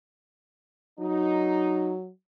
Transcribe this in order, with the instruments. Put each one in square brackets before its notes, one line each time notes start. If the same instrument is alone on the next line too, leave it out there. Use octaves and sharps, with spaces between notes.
[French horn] F#3 [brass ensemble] D#4